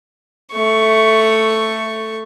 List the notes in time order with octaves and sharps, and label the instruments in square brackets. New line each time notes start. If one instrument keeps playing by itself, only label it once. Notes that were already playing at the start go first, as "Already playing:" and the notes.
[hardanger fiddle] A3 C#6